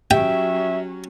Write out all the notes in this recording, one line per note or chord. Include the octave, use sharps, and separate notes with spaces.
F#3 C#4 G4 E5 G5